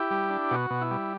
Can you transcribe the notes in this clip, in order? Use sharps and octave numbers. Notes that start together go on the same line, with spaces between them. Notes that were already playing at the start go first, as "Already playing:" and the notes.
Already playing: E4 G4
G3
D4
B2 F#4
B2
E4
G3